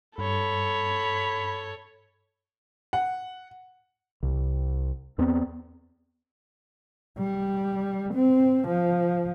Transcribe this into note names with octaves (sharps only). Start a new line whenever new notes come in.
G2 A4 C#5 B5
F#5
C2
E2 B3 C4
G3
C4
F3